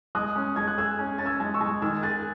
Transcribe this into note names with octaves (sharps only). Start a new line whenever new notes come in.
G#3 D#6 F#6
C#4
G#3 G#6
F#6
G#4 E6 G#6
C#4
C#4 A6
E6 G#6
G#3
C#6 E6
G#3
D#3 E6 G#6
G#4 F#6 A6